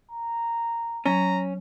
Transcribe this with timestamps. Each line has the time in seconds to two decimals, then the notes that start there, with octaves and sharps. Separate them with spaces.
0.11 A#5
1.06 F#3 C#4 A#5